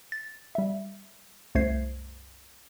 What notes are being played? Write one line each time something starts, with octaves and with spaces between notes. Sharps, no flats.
A6
G3 E5
C2 F#2 A3 C5 G#6 C7